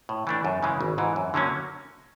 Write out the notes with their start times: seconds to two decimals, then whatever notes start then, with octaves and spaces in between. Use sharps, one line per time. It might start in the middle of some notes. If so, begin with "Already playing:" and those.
0.09 A2
0.27 E3 A3 D4
0.45 F#2
0.63 C#3 E3 G#3
0.81 G#1
0.98 G#2 E3
1.16 F#2
1.34 D3 F#3 A#3 C#4